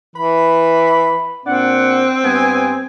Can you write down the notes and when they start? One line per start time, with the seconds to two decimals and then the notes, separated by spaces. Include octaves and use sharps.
0.16 E3 B5
1.46 A#2 C4 D4 F#5
2.24 G2 B3 G#5